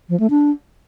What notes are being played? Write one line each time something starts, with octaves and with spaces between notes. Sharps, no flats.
F3
A3
D4